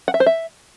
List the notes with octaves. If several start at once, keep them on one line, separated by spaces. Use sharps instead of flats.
F#5
E5
C5
E5